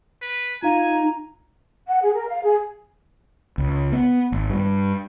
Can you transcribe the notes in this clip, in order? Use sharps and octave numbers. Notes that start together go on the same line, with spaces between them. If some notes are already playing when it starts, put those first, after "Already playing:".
B4
D#4 F4 F5 G#5 A#5
F#5
G#4
A#4
F5
G#4
C#2
B3
G#1
G2